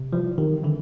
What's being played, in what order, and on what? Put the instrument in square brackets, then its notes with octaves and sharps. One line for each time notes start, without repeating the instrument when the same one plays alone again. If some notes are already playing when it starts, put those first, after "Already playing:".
Already playing: [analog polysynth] C3
[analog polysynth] E3 G3 [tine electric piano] F3
[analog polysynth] C3 [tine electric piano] D#3
[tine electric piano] D3 [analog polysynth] E3